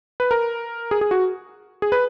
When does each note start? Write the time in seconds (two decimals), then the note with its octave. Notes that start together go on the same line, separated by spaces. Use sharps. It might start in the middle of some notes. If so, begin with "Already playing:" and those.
0.20 B4
0.31 A#4
0.91 G#4
1.01 G#4
1.11 F#4
1.82 G#4
1.92 B4